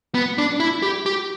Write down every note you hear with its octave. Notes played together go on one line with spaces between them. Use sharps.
B3
D4
E4
G4
G4